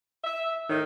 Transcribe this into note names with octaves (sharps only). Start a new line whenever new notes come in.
E5
A2 D#3